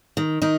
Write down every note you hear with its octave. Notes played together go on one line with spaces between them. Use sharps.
D#3
D#3 D#4